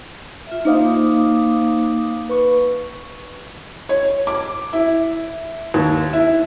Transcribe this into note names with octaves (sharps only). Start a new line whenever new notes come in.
F4 E5
A#3 D#4 C5 F5 D6 D#6
B4 C#6
C#5
D6
E4
D#2
E4